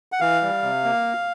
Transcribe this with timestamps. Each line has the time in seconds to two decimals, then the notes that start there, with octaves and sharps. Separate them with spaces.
0.12 F#5
0.20 E3 F5
0.42 G3
0.63 C3
0.84 A#3